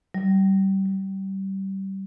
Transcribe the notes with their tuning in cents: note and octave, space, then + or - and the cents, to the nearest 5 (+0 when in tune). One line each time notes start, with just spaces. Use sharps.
G3 -25
G3 -20